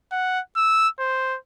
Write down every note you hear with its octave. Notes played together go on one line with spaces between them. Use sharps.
F#5
E6
C5